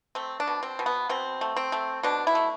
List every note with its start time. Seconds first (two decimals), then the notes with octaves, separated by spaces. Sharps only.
0.15 A3 C4
0.40 D4
0.47 B2
0.63 C4
0.79 B2
0.86 B3
1.09 B2 C4
1.41 A3
1.56 C4
1.72 A3
2.03 B2 D4
2.27 E4
2.35 A3